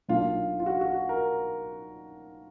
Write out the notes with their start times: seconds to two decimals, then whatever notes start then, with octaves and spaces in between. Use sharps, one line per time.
0.08 B1 A#2 F#3 D4 F4
0.60 F4
0.66 F#4
0.81 F#4
1.09 A#4